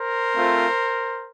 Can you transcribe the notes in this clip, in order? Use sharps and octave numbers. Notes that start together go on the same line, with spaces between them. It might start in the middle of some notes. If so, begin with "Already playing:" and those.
Already playing: A#4 C5
A3 C4 F4